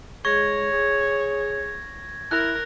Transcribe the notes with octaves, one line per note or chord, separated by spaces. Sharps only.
G#3 C#5 C#6 G#6 A#6
G#4
E4 A#4 F#6